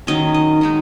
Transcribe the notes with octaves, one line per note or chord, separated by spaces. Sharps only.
D#3 F#3 C#4 D#5
D#5
D#3 G#3 D#4 D#5